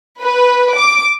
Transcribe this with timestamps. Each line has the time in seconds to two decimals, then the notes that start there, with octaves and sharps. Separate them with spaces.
0.22 B4
0.76 D6